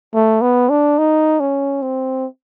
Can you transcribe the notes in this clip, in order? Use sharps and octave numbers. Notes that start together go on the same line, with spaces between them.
A3
B3
D4
D#4
C#4
C4